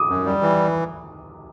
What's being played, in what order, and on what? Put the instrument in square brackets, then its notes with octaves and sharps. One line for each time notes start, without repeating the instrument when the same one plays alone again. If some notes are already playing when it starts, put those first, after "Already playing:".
Already playing: [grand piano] D6 D#6
[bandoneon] F#2
G3
E3